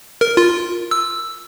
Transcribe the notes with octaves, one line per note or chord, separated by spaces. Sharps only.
A#4
F4
E6